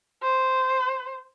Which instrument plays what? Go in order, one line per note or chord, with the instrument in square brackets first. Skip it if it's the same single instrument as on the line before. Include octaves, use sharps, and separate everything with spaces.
[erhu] C5